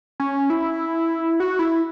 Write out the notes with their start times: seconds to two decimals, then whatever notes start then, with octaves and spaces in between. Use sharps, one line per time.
0.20 C#4
0.50 E4
1.40 F#4
1.59 E4